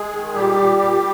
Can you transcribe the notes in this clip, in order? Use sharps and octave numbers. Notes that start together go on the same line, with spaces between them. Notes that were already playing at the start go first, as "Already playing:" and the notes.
Already playing: G#3 G#4
D#3
A#2 G3 G4
A#2
A#2